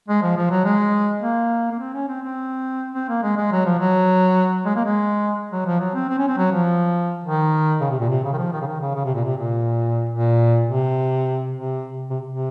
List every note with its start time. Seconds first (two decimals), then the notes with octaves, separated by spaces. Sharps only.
0.08 G#3
0.22 F3
0.37 F3
0.50 F#3
0.65 G#3
1.22 A#3
1.72 A#3
1.79 C4
1.94 C#4
2.08 C4
2.23 C4
2.94 C4
3.09 A#3
3.23 G#3
3.37 G#3
3.52 F#3
3.66 F3
3.79 F#3
4.66 G#3
4.76 A#3
4.85 G#3
5.52 F#3
5.66 F3
5.80 F#3
5.95 C4
6.09 C4
6.19 C#4
6.28 C4
6.38 F#3
6.52 F3
7.24 D#3
7.81 C#3
7.91 C3
8.00 A#2
8.09 C3
8.24 C#3
8.33 D#3
8.38 F3
8.52 D#3
8.62 C#3
8.67 D#3
8.81 C#3
8.95 C#3
9.05 C3
9.14 A#2
9.24 C3
9.38 A#2
10.10 A#2
10.67 C3
11.53 C3
12.10 C3
12.29 C3